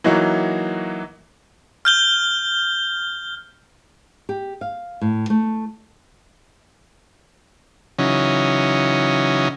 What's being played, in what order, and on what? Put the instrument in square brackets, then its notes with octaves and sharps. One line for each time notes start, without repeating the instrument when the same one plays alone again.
[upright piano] E3 F#3 A#3 D#4 F#4
[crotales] F6 G6 G7
[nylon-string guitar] G4
F5
A2
A3
[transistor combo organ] C#3 E3 F#3 C#4 D#4